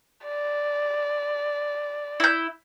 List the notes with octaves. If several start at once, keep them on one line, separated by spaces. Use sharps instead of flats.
D5
E4 G6